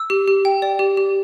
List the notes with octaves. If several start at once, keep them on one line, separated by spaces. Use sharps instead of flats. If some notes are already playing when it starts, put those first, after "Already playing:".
Already playing: E6
G4
G4
G5
D5
G4
G4